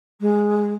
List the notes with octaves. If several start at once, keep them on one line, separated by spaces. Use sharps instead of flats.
G#3